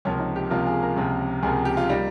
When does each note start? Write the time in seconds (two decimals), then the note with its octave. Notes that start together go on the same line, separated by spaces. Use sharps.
0.05 C#2 C3 F3 A#3 C#4
0.20 D#4
0.36 G4
0.50 C#2 C3 F3 A#3 F4
0.67 G#4
0.82 A#4
0.96 C#2 C3 F3 A#3
1.43 C#2 C3 F3 A#3 G#4
1.65 G4
1.77 F4
1.89 G3 A#3 D#4